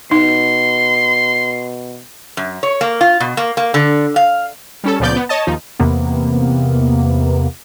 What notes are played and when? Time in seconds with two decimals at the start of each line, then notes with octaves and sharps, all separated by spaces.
0.11 B2 D#4 C6
2.37 F#2
2.63 C#5
2.81 A#3
3.01 F4
3.20 B2
3.37 A#3
3.57 A#3
3.74 D3
4.16 F5
4.84 G3 C#4 A4
5.00 C#2 A#2 F3 B3 D5 G6
5.16 B3
5.29 C#5 D#5 A5
5.47 D#2 F3 D#4
5.80 E2 C3 A#3 B3